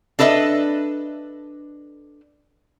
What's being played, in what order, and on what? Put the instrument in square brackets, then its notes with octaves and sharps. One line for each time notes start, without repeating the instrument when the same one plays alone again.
[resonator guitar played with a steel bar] D4 A4 B4 D#5 E5